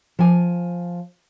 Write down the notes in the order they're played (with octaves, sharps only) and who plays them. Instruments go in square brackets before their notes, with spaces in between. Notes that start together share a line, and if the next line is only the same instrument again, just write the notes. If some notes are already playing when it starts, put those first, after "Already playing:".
[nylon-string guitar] F3 G#5